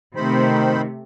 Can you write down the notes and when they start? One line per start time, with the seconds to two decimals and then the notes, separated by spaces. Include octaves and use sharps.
0.16 C3 D#3 A3 C4 C5 B5